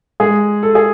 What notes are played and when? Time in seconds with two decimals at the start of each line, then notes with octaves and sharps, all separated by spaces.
0.20 G#3 G#4
0.63 A4
0.75 G#4